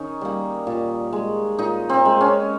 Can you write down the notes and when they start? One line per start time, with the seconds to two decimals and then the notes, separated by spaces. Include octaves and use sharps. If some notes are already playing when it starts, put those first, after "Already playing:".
Already playing: D#3 C#4 D#4
0.21 G3 A#3
0.67 A#2
1.13 G#3
1.59 A#2 D#4
1.89 C4
2.05 G#3
2.21 C#4